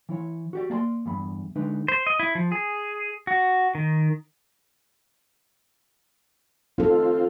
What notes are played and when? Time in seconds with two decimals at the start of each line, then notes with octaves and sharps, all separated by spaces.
0.09 E3 E4 C#5
0.53 F#4 G4 D5
0.70 A#3 D5 A5 C6
1.06 E2 G2 B5
1.55 D3 G#3 D4 D#4 B4
1.88 C5
2.07 D#5
2.20 E4
2.35 F3
2.52 G#4
3.27 F#4
3.75 D#3
6.78 C4 D#4 F4 A4